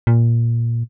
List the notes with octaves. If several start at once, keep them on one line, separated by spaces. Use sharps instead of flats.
A#2